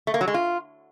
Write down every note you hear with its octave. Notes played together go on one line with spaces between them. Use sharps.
A3
A#3
F#3
G#3
F4